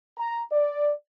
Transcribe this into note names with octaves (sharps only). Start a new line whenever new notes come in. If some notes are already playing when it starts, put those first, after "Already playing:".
A#5
D5